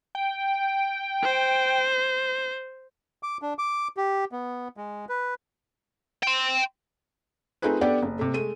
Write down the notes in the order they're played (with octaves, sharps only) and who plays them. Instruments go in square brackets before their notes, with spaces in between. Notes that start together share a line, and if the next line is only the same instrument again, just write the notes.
[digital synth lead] G5
[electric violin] C5
[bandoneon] D6
D4
D6
G4
B3
G#3
B4
[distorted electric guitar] G5 C6
[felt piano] A3 C4 D#4 F4 G#4 B4
B3 D4 G4 A4 D5 F#5
F#1
C3 A3
G#3 A3 D#7